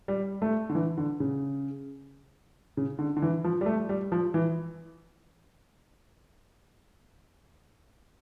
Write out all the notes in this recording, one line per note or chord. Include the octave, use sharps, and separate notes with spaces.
G3
A3
D3
E3
D3
C#3
C#3
D3
D3
E3
F3
G3
A3
G3
F3
E3